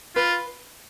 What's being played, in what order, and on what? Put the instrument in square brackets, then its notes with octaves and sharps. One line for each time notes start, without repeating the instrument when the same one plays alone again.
[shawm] F4 [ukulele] B4